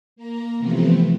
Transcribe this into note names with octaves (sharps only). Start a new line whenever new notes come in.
A#3 A#5
C3 E3 F3 A3 B3 C4